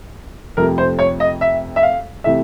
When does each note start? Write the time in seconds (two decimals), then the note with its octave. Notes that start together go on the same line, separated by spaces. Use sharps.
0.57 F2 C3 F3 A3 A#4
0.78 C5
0.99 C#5
1.20 D#5
1.41 E5
1.76 E5
1.83 F5
2.24 C3 E3 A3 E5